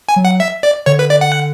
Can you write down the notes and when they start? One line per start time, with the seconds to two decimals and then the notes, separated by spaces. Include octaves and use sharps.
0.09 G#5
0.16 F#3
0.25 F#5
0.40 E5
0.63 D5
0.86 D3 C#5
0.99 B4
1.10 D5
1.21 F#5